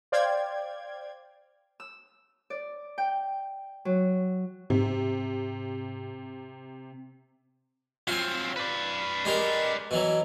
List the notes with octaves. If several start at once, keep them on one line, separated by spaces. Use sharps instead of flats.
C5 D5 F5 G5 G#6
E6
D5
G5
F#3
G#2 C3
F#3 C4 F4 G#5
B4 D5
G#3 G4 A#4
B2 E3 F#3